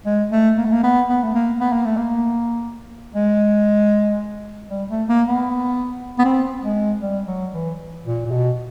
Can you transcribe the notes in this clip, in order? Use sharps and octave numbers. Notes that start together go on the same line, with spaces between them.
G#3
A3
A#3
A3
A#3
B3
B3
A3
A#3
B3
A#3
A3
A#3
G#3
G3
A3
A#3
B3
B3
C4
G#3
G3
F#3
E3
A#2
A#2
B2